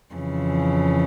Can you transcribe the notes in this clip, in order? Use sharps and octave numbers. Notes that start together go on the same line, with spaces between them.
F2 C#3 E3